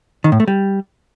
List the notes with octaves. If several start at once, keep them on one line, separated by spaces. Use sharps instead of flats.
D#3
A2
A3
G3